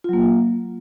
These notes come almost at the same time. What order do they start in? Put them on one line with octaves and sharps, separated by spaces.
F4 F#3 A#3